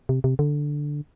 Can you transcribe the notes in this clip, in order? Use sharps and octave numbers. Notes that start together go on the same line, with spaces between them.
C3
C3
D3